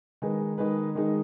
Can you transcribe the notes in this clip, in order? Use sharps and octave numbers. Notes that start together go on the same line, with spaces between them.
D#3 G#3 D#4 G#4 B4
D#3 G#3 D#4 G#4 B4
D#3 G#3 D#4 G#4 B4